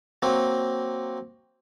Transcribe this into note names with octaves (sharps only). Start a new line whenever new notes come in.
F#3 A#3 C4